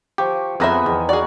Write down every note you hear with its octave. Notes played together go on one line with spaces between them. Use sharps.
F3 G4 C#6
F2 B3 F4 G#4 B4 C5 E5 A#5
E2 D#3
F#4 G#4 D5